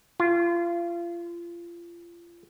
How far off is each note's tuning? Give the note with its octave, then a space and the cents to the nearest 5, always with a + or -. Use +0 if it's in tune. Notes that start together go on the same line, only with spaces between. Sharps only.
F4 -30